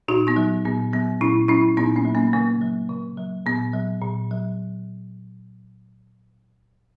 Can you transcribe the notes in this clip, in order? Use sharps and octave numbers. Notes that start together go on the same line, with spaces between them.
A#2 D#4 F#4
B3 D#4
F#3
A#2 B3
F#3 B3
A#2 C#4 E4
F#3 C#4 E4
A#2 B3 D#4
A#3 C#4
F#3
A#3 C#4
C#3 A#3
F#3
C#3
F#3
A#2 B3
F#3
A#2
F#3